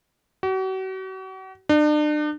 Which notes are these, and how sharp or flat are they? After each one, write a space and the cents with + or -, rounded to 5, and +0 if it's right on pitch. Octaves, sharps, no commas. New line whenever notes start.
F#4 +40
D4 +40